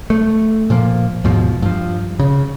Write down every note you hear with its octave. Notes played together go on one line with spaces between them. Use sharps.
A3
A#2 F3 A#3
D#2 G#2 B2 F3
G2 F3
C#3